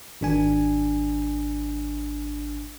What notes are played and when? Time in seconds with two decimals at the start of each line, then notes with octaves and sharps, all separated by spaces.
0.21 G#1 D4 G#5